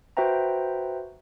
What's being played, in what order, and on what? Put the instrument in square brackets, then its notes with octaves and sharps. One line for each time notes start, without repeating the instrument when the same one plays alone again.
[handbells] F#4 B4 C5 E5 G5 A#5